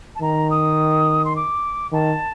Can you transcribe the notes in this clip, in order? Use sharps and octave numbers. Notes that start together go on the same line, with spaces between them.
A5
D#3 A#5
D#6
C6
D6
D#3 A5